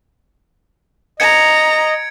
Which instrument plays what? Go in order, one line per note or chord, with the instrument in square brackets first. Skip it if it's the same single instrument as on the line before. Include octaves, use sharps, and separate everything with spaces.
[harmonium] D#5 [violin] A#5 [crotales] G#6 C#7 D7